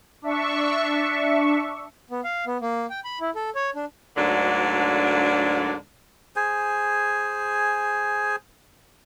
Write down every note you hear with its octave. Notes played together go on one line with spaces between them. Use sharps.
D4 E5 C#6
B3
F5
B3
A#3
G5
B5
E4
A4
C#5
D4
D2 G#2 D3 F#3 A#3 D4
G#4 C5 G#5